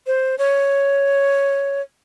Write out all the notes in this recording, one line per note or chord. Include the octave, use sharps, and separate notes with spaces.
C5
C#5